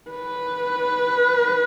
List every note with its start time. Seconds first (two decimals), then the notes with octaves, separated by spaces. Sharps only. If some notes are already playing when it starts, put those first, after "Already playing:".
0.11 B4